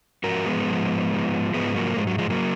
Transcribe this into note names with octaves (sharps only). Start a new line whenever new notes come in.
G#2 F3 F#4 A#4
G#3 B3
G#2 F3
G#2 F3
G#2 F3 G#3 B3
F#3 A#3
G#2 F3 G#3
F#3
F3 G#3
F#3 A#3